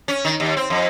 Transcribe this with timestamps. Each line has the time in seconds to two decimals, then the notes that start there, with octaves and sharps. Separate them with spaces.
0.08 C#4
0.25 D#3
0.40 D#2
0.57 C4
0.70 F2